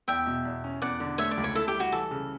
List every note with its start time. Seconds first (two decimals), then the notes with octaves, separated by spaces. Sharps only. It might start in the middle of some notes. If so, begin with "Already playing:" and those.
0.08 E2 E5 G5
0.27 B2
0.45 E2
0.64 C#4
0.82 E2 D5 F#5
1.00 D3
1.18 A3 C#5 E5
1.31 D5
1.37 C#2
1.44 C#5
1.55 E4 A4
1.68 G4
1.74 G3
1.80 F#4
1.92 E3 A4
2.11 C#3